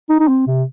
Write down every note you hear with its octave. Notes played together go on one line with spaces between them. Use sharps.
D#4
D#4
C4
C3